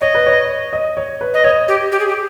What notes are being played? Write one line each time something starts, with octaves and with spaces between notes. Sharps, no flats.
C#5 D#5
B4
C#5
D#5
C#5
B4
D#5
C#5 D#5
G4
G4
G#4
G4